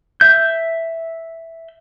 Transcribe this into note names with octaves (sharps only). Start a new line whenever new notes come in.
E5 G6